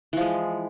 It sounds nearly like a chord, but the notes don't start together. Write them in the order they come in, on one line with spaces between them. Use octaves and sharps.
E3 F3 G#3